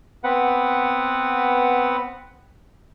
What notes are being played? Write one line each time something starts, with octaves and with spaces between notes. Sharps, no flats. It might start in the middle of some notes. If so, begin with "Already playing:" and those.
B3 C4 B4 F#5